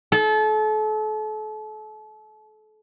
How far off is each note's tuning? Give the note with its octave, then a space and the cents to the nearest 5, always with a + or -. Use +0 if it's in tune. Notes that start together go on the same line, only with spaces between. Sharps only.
A4 -35